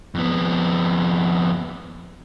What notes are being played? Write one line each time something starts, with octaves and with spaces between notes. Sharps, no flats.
F2 B3